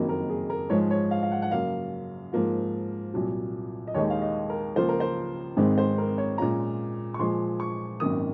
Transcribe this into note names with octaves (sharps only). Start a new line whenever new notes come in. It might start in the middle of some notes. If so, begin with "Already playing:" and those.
Already playing: F#1 F2 D#3 F#3 A#3
A#4
G#4
A#4
G#2 F3 G#3 C#5
C#5
F5
F5
F#5
F#5
F#2 C#3 F#3 A#3 F5
G#2 F3 A#3 F4
C2 A#2 F#3
D#5
D#2 D#3 G#3 D#4 C#5
F5
D#5
A#4
C#2 C#3 F3 A#3 F4 C5
A#4
C5
G#1 G#2 D#3 G#3 C4
C5
A#4
C#5
A#2 G#3 C#4 F4 A#5
C#6
A#2 F3 G#3 C6
C#6
G#1 F#2 D#3 A#3 D#6